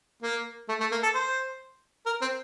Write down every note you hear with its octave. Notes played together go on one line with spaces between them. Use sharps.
A#3
A3
A3
A#3
A4
C5
A#4
C4